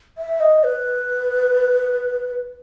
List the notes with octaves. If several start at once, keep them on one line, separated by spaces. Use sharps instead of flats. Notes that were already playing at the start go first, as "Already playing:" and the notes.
E5
D#5
B4